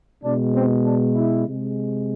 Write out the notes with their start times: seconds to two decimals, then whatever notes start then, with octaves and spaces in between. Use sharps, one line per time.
0.23 B2 G#3 D4
0.54 C4
0.85 D4
1.15 E4
1.47 C3 G#3